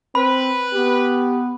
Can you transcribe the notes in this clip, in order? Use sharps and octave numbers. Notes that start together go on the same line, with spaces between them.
C4 B4 B5
B3 G4